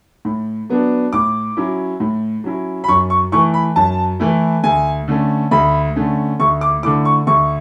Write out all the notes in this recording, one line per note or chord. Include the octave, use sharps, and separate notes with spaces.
A2
F#3 B3 D4
A2 D6
F#3 C#4 E4
A2
F#3 C#4 E4
B5
F#2 C#6
C#6
E3 A3 E4 C#6
B5
F#2 A5
E3 A3 E4
D2 G#5
D3 A3 C#4
D2 B5
D3 A3 C#4
D2 C#6
D6
D3 A3 E4 D6
C#6
D2 C#6